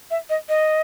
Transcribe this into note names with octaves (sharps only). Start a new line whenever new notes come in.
E5
D#5
D#5